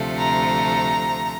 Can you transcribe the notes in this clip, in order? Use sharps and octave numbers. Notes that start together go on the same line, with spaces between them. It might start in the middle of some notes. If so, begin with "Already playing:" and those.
Already playing: D2 C3 F3 A3
A#5